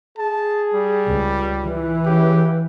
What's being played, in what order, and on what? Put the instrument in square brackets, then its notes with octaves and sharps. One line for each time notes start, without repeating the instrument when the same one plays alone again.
[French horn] G#4 [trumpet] A5
[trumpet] G3
[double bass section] C#2
E3
[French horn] C#3 [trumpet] G4